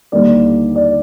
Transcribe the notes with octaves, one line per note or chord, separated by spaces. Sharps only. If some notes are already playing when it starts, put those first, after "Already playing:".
D#2 D3 G3 A#3 D5
D5